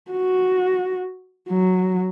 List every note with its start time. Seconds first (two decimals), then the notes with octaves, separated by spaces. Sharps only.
0.11 F#4
1.49 F#3